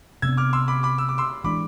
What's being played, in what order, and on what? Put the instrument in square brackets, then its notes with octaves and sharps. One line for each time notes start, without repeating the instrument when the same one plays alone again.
[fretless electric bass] C3 G#3 B3 D4 [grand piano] E6 G#6
[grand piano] D6 F6
C6 E6
B5 D6
B5 D6
E6
D6
C6 E6
[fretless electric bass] E3 G#3 D4 [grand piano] B5 D6